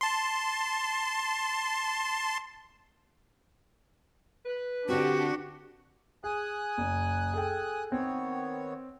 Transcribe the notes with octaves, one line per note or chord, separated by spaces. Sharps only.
A5 C6
B4
D3 C4 D4 F#4 G4
G#4 G#5 D#6 F#6
F#1
G#4 A4 G5
D#3 B3 C4 C#5